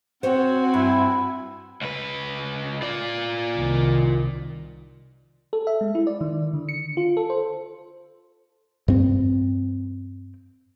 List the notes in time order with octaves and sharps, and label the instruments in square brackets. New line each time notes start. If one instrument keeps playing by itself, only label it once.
[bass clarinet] C4 [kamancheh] F#4 G#5 [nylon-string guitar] C5 C#5
[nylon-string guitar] G2 [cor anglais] E4
[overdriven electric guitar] C#2 B4
F4 D5
[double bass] C2 D#3
[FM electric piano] A4
E5
G#3
E4
D5
D#3
D3
C#7
F4
A4
C5
[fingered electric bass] G2 C4